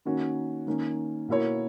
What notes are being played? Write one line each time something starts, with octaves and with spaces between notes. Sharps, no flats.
D#3 A#3 C#4 F#4
D#3 A#3 C#4
B2 A#3 E4 A#4 C#5